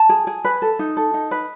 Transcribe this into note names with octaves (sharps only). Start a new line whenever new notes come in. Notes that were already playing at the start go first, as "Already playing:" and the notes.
Already playing: A5
G#4
G#4
B4
A4
D#4
A4
D#4
B4